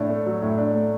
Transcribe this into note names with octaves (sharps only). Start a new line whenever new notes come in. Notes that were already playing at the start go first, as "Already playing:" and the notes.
Already playing: A2 D4
A3
F#3
A2
D4
A3